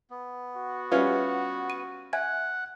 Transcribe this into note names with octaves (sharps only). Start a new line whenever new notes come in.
B3
F#4
G3 C#4 F4 B4 E5 F6
D#7
E5 F#5 G#5 G#6